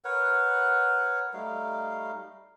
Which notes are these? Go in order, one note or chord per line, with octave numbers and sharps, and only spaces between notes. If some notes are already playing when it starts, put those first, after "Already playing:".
A#4 B4 C#5 F#5
G3 A3 D#4 F5